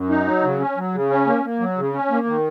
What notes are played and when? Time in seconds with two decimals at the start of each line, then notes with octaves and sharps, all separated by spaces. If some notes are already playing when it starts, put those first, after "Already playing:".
Already playing: F#2
0.10 D#4
0.27 F#3
0.44 C#3
0.60 C#4
0.77 F#3
0.94 C#3
1.10 C#4
1.26 A#3
1.44 A#3
1.60 F#3
1.77 C#3
1.94 C#4
2.11 A#3
2.27 D#3